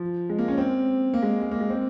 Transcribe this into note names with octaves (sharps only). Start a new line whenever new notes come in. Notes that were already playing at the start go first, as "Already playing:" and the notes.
Already playing: F3
G#3
A#3
C#4
C4
A#3
G#3
G#3
A#3
G#3
C4